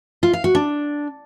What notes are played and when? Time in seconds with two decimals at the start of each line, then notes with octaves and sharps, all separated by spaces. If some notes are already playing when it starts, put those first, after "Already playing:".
0.23 F4
0.33 F5
0.44 F#4
0.55 D4